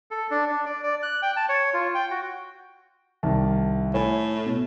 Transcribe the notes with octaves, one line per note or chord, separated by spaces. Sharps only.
A4
D4
D4
D5
D5
F#6
G5
A5
C#5
F4
G5
F#4
C2 D#3 A5
A2 C#5 G#5 B5
B2